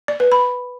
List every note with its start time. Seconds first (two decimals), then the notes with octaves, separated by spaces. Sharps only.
0.08 D5
0.20 B4
0.32 B5